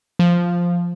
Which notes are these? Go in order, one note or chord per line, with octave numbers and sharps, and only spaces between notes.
F3